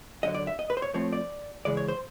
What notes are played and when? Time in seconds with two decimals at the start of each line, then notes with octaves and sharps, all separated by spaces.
0.23 F#2 D3 F#3 D#5
0.34 D5
0.47 E5
0.59 D#5
0.70 B4
0.77 C5
0.82 C#5
0.94 A2 F3 A3 C4 C#5
1.13 D5
1.65 C#3 E3 G#3 D5
1.77 C#5
1.88 C5